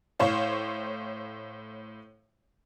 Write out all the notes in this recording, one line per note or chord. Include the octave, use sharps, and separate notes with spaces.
A2 C5 C#5 F5